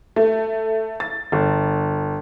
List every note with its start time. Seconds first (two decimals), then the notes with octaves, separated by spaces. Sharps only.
0.16 A3
1.00 A6
1.32 G1